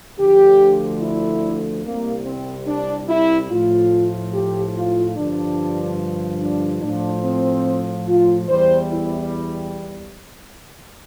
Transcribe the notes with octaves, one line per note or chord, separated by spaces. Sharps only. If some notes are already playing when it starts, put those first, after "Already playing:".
D2 D3 F3 G4
E4
C2 C3 G3 A#3
C4
D4
E4
A2 F3 F4
G4
F4
G2 D3 F3 D4
D4
A2 F3 D4
C4
F4
E2 E3 G3 C5
E4